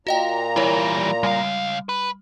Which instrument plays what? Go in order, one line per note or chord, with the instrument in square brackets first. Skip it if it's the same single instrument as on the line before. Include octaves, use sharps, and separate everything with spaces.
[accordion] A#2 A#5 [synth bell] F#4 D#5 G5
[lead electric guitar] E3 G3 [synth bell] E4 A#4 C#5
[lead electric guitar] C#2 F5 [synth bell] G3
[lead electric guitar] B4